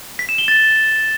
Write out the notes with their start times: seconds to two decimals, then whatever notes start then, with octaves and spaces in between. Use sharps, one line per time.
0.19 B6
0.29 E7
0.38 G7
0.48 A6